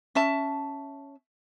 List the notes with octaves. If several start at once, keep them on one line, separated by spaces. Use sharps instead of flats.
C#4 E5 A5